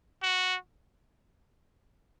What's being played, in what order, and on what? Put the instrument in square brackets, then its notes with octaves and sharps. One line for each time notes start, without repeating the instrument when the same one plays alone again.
[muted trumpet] F#4